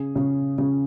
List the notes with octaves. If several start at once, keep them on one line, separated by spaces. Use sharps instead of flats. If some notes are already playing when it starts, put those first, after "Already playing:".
Already playing: C#3 G#4
C#3
C#3